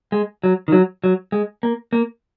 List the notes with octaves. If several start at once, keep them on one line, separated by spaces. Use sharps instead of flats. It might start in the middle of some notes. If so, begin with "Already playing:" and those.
G#3
F#3
D#3
F#3
F#3
G#3
A#3
A#3